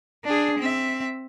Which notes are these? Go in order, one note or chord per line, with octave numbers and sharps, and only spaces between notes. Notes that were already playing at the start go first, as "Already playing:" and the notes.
D4 G#4
C4 E5